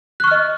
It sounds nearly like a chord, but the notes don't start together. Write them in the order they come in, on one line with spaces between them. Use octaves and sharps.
F#6 C#6 F6 D#5